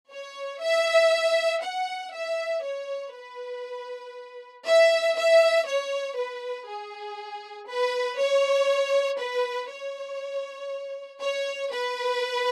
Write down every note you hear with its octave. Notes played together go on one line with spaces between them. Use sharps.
C#5
E5
F#5
E5
C#5
B4
E5
E5
C#5
B4
G#4
B4
C#5
B4
C#5
C#5
B4